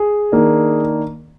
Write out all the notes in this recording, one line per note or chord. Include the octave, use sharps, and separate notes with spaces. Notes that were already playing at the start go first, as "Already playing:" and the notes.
Already playing: G#4
D#3 A#3 D4